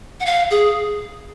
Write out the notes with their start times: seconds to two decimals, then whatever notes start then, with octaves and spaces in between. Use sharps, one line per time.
0.20 F#5
0.25 F5
0.51 G#4